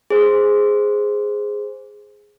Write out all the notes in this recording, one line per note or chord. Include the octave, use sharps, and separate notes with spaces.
G#4 C5